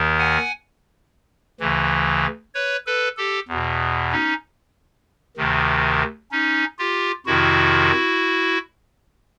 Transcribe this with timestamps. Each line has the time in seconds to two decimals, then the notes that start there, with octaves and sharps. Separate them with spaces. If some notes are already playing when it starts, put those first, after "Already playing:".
Already playing: D#2 D#3
0.18 F#5 G#5
1.60 D2 C#3 E3
2.54 B4 C#5
2.87 A4 B4
3.17 G4 A4
3.48 E2 B2
4.12 C#4 D#4
5.37 D2 C3 D#3
6.31 C#4 D#4
6.79 F4 G4
7.26 F2 C3 D#3 E4 F#4